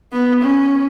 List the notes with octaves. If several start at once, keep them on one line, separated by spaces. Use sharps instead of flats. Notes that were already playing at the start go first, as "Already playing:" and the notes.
B3
C#4